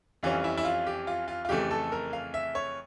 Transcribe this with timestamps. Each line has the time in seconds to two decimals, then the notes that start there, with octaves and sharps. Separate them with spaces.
0.23 F2 E3 G3 C#4 F4
0.44 E4
0.57 E4
0.65 F4
0.86 G4
1.07 F4
1.28 F4
1.45 F4
1.49 F2 C#3 E3 A3 G4
1.71 A4
1.92 A#4
2.13 F5
2.34 E5
2.55 C#5